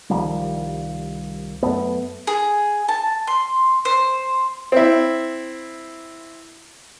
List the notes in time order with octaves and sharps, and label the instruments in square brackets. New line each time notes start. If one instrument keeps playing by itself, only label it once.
[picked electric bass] C2 D#3 F3 G3
F#2 A3 B3
[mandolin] G#4
A5
C6
C5
[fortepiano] C4 E4